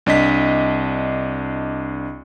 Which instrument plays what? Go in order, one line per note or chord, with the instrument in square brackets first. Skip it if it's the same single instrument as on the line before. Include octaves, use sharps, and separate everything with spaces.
[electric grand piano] C2 D4 D#5 B6